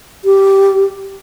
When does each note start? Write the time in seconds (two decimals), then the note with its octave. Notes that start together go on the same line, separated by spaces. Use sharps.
0.25 G4